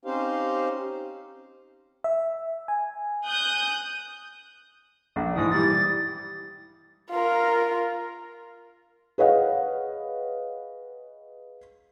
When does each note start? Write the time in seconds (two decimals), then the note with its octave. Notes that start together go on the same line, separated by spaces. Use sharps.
0.05 C4 C#4 D#4 G4 C5 F5
2.04 E5
2.68 G#5
3.26 D#6 F#6 G6
5.16 A#1
5.35 G#2 E3 D#6
5.52 E3 G3 A6
7.10 F4 A#4
9.18 G#4 B4 C#5 D#5 F5 F#5